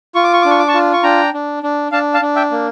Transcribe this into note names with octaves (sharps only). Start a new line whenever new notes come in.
F4 C#6
D6
C#6
D4 D6
C#6
D6
A5 C#6
F4
C#6
D4 G5 A#5
D4
D4
D4 F5 A5
F5 A5
D4
E5 G5
A#3